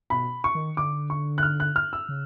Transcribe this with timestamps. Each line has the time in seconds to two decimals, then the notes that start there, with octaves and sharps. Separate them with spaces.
0.10 B2 B5
0.44 C#6
0.55 D#3
0.77 D3 D6
1.10 C#6
1.38 F#6
1.43 F6
1.60 F#6
1.76 F6
1.93 E6
2.09 C#3